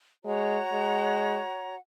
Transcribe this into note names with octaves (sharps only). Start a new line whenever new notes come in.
G#3 F#4 C#5 F#5 A#5
G#3